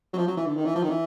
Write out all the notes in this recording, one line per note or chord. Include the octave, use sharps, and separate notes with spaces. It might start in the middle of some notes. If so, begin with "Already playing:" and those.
F#3
F3
F#3
E3
D3
D#3
E3
F3
D#3
E3